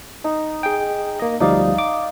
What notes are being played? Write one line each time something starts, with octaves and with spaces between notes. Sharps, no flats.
D#4
G#4 G5
A#3 D#5
D2 F3 G3 D#4 D5 F5
D6